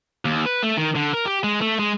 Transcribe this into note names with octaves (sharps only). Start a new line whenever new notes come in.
D#2
B4
A3
D#3
D3
A#4
G4
G#3
A3
G#3